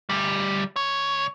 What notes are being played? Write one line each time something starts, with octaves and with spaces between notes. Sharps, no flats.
D2 G3
C#2 C#5